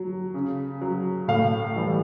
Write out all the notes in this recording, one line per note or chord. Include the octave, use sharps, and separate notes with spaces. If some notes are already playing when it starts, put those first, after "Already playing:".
Already playing: F#3
C#3
F#3
A2 F5
E3 G3